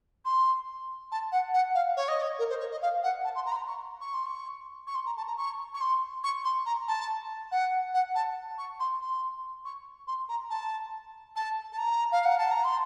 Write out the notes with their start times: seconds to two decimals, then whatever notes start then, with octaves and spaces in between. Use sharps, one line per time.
0.25 C6
1.12 A5
1.32 F#5
1.54 F#5
1.74 F5
1.97 C#5
2.08 D#5
2.21 C#5
2.39 A#4
2.49 C5
2.60 C#5
2.71 D#5
2.82 F5
3.03 F#5
3.24 A5
3.35 C6
3.46 A#5
3.52 C6
3.56 A#5
3.67 C#6
4.01 C#6
4.14 C6
4.26 C#6
4.87 C#6
4.95 C6
5.06 A#5
5.17 A5
5.27 A#5
5.37 C#6
5.74 C#6
5.81 C6
6.24 C#6
6.44 C6
6.66 A#5
6.88 A5
7.52 F#5
7.94 F#5
8.15 A5
8.58 C#6
8.80 C6
9.01 C6
9.65 C#6
10.07 C6
10.29 A#5
10.50 A5
11.36 A5
11.72 A5
11.78 A#5
12.12 F5
12.25 F#5
12.38 A5
12.51 A#5
12.64 C6